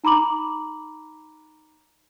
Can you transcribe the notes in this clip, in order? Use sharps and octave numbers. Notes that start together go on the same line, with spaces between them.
D#4 A#5 B5 D6 F#7